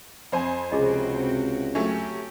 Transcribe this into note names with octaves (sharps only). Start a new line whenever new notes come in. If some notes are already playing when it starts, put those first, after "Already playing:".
F2 C5 G#5
C#2 C3 C4 F#4 G#4 D#5
F#3 A3 C#4 G4